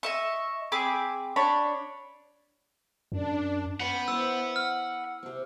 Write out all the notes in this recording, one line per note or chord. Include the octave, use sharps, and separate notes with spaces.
D#5 E5 C#6
C4 G#4 B5 D6
D4 C#5 B5
F#2 D4
C#4 F#5 G5 B5 C6
B3 E4 C5 E6
F6
C3 C4